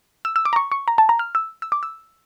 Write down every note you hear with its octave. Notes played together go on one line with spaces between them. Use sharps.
E6
E6
D6
A#5
C#6
C#6
A#5
A5
A#5
F6
E6
E6
D6
E6